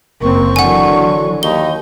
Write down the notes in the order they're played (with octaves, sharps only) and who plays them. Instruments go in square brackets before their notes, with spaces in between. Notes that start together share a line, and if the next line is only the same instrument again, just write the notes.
[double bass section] F#1 A#3 C4 [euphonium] A#4 [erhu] C#6
[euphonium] D3 [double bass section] E3 F#3 [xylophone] F#5 G#5
[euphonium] D#2 [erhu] D#4 [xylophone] G7